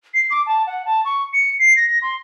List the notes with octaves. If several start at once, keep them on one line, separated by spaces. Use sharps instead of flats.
C7
D6
A5
F#5
A5
C#6
C#7
C7
A#6
C6